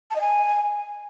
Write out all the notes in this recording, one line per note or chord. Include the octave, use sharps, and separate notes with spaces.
A5
D#5
G#5